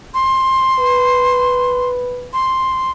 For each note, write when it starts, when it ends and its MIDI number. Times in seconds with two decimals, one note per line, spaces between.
0.14 1.90 84
0.79 2.31 71
2.33 2.91 84